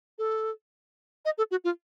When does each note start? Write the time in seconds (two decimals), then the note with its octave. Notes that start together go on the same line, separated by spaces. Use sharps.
0.18 A4
1.25 D#5
1.38 A4
1.51 F#4
1.64 F4